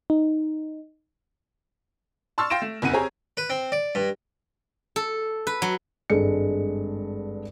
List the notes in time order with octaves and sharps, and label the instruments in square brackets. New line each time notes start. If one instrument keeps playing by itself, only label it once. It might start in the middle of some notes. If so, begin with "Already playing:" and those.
[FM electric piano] D#4
[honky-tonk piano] A5 C6 C#6 E6 F6 A6
F5 G5 C6 A#6 D7 E7
A3
F#1 E2 C#3 F#5 D#7
C4 G4 G#4 C#5 G#5 A#5
[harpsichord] B4
C4
D5
G2
[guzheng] A4
B4
F#3
[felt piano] G#1 G2 G#3 A4 C#7